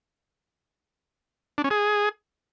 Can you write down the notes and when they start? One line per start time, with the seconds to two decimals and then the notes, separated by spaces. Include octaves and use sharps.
1.58 D4
1.64 C#4
1.71 G#4